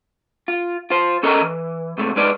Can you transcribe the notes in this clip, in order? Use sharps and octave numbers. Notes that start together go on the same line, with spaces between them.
F4
F4 C5
C#4 A4 A#4 D#5 G#5 A#5
E3
G#2 C3 A3
G#3 D#4 B4 D5